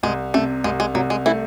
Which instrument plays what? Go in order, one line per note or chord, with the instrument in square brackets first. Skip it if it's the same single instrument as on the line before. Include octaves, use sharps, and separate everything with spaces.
[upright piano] C2 [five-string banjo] G#3
[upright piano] C3 [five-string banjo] A3
[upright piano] C2 [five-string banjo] G#3
[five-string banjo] G#3
[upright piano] C2 [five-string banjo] F#3
[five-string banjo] G#3
[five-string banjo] E3 E4 [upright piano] A3